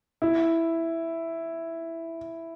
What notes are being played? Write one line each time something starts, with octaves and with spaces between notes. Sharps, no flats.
E4